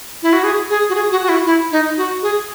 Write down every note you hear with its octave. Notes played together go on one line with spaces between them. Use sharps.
E4
F#4
G#4
G#4
F#4
G#4
F#4
F#4
E4
E4
D#4
F#4
G#4